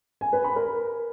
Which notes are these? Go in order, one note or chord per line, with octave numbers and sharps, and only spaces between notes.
G#5
B4
B5
A#4